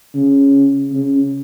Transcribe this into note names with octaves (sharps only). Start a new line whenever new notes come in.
C#3
C#3